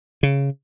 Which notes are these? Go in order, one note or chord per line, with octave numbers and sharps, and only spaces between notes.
C#3